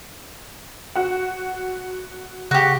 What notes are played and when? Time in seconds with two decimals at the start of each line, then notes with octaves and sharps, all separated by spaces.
0.95 F#4 F#5
2.51 C#3 F#4 G4